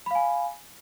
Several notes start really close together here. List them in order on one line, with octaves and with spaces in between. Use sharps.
B5 F5 G#5